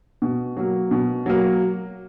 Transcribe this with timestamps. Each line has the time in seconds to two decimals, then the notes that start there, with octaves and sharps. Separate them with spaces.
0.22 B2
0.57 F#3 A#3
0.91 B2
1.26 F#3 A#3